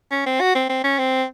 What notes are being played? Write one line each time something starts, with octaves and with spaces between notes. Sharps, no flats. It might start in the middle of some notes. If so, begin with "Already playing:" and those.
C#4
C4
F#4
C4
C4
C#4
C4